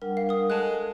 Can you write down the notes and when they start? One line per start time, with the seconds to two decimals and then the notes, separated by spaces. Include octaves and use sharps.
0.02 G3 D4 A#4 F#5
0.17 F5
0.29 A#4 D#6
0.50 G#3 A4 A5 F#6